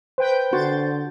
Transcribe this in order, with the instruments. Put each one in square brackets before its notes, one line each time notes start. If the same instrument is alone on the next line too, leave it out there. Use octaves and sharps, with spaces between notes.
[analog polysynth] B4 G5 G6 [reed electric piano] C5
[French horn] D3 [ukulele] F#4 [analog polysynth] C6 G6 A6